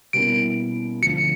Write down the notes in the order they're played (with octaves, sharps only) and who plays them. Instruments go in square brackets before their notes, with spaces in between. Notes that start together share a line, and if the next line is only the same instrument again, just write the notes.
[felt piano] B2 G3 A#3 C#4 E4 [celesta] D7
[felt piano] D2 D3 F3 [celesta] C#7